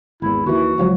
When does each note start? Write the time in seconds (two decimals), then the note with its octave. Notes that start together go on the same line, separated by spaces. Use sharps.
0.22 G#1 E2 E4
0.46 D#2 E3 F#4
0.78 C#2 F3 F#3